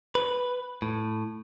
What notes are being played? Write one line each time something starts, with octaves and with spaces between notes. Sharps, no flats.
B4
A2